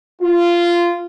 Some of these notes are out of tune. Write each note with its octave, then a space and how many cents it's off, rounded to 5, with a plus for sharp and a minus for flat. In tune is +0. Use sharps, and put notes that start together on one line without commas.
F4 -15